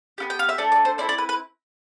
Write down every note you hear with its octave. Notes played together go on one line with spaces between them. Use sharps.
B3 E4 G4
G5
F5
E5
A3 D4 A4 D5
D5
C5
C4 E4 A4 D5
D5
B4
B4